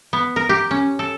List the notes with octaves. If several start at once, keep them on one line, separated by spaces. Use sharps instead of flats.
B3
A#4
G4
C#4
A4